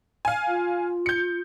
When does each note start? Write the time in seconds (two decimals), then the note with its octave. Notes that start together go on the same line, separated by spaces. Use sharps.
0.25 F5 G#5
0.48 F4
1.06 G6 C#7